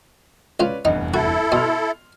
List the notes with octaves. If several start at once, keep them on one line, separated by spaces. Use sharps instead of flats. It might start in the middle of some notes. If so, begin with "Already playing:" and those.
C#2 C#4 F4 B4 D5
F1 E2 G2 D#4
E4 F#4 A4
B2 C6 F6